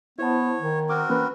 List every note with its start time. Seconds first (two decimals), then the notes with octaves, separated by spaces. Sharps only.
0.19 B3 E4 C5 C#5 A5
0.60 D#3
0.89 C4 F#4 A#4 D6
1.10 E3 A#3 C#4 B4